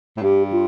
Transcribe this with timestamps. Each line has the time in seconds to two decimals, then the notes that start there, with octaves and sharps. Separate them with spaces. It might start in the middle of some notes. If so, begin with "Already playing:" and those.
0.17 A2
0.22 G2 G4
0.52 F4